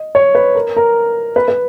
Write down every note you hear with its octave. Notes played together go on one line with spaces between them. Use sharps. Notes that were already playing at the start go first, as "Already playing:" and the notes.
Already playing: D#5
C#5
B4
A#4
A#4
B4
B4